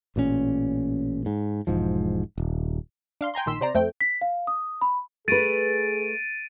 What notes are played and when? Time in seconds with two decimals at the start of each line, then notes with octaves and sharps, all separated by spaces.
0.16 A1 A#2 D3 C#4
1.26 G#2
1.67 E1 G#2 F3
2.38 D#1
3.21 D4 F5 C6
3.34 G5 G#5 A#5 C6
3.46 A#1 D#3 C6 E6 B6 E7
3.61 C3 C5 D5 A#5
3.75 F2 A3 C4 G5
4.01 B6
4.21 F5
4.47 D#6
4.81 B5
5.28 A3 G#4 B4 A6 D7 D#7